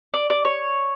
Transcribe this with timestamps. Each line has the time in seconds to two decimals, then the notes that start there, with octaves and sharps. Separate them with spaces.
0.14 D5
0.30 D5
0.45 C#5